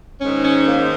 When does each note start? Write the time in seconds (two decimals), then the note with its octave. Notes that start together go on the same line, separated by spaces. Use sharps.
0.20 G#2 D#3 C#4
0.44 C#4
0.67 A#3